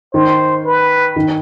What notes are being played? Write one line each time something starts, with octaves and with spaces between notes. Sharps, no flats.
D#3 C5
B4
D#3